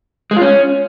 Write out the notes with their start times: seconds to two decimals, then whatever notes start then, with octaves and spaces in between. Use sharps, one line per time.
0.31 G#3
0.36 F4
0.42 C#4